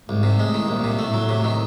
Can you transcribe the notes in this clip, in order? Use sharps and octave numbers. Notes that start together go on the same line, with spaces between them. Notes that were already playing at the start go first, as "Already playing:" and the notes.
C2 G#2
C3
A2 G#3
D#3
C2 A#2
C3
A2 A3
F#3
C3
D#3